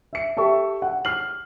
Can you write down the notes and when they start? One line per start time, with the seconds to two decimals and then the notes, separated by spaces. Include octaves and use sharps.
0.13 E5 C#7
0.37 G4 A4 E5 C#6
0.82 F#5
1.05 F6 C7 F#7